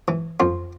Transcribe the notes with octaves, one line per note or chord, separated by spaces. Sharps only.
E3
F2 F4